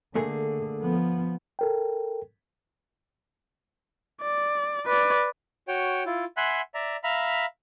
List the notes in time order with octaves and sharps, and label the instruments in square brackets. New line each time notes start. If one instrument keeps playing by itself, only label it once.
[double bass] D3 [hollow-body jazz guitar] A3 A#3 G#4
[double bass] F3 B3
[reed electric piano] A4 A#4 G5
[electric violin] D5
B4 D5
[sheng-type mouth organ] F#4 C#5 G5
E4 F4
E5 F#5 G#5 B5 C6 F#6
D5 E5 A#5
E5 F5 A#5 B5